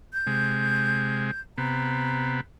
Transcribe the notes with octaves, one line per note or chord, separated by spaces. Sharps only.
G6
C3 G#3
C3 B3 A#5